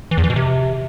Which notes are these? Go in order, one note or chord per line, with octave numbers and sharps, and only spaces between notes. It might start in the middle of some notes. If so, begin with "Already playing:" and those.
E3
E2
E3
B2
C3